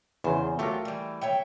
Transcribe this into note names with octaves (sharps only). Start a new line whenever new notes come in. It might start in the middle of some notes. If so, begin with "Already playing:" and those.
E2 C#3 C5
F#3 A3 F4 G4 A#4
E3 G3
C#5 E5 G5